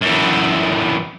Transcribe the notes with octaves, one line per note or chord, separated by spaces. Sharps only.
F#2 E3